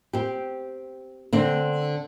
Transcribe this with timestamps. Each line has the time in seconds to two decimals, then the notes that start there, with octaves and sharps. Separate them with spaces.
0.13 C4 G4
1.33 D3 C4 D4